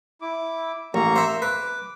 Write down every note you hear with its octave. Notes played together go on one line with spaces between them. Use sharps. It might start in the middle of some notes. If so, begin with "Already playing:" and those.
E4 D6
A1 A#3 A#5 C#6
C5 E5
B4 D6